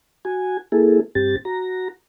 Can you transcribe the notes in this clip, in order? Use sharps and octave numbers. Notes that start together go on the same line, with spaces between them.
F#4 G#5
A#3 E4 G#4 A4
G2 C4 G4 A6
F#4 A#5